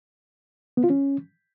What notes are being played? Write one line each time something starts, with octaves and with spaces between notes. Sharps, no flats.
B3
F4
C#4